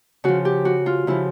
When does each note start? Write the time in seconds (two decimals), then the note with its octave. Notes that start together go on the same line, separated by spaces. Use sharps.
0.24 C#3 F3 F#4
0.45 G4
0.65 F#4
0.86 F4
1.07 C#3 F3 E4